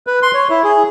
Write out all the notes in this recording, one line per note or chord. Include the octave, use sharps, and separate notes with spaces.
B4
C6
C#5
E4
G#4